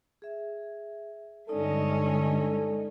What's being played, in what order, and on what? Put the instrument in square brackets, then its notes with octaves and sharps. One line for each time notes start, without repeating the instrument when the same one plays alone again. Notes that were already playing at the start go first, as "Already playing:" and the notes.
[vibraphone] G#4 E5
[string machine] G2 D3 D#5 [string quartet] G#3 C#4 [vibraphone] D#4 D5 [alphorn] A4